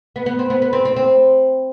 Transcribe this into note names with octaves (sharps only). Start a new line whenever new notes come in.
B3
B3
C4
B3
B3
C4
C4
C4